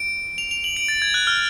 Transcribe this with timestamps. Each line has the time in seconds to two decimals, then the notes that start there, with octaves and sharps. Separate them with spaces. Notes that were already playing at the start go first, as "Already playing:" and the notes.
Already playing: D7
0.38 F7
0.51 F7
0.64 F#7
0.77 D7
0.88 A6
1.02 G#6
1.14 F#6
1.27 F6